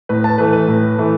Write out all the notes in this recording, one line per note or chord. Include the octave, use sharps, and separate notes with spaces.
A2 B4
A5
E3 A3 B4
B4
A2
E3 A3